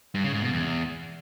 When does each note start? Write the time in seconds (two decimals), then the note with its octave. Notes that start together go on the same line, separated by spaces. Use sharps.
0.15 G2
0.24 C#3
0.33 G#2
0.42 B2
0.52 E2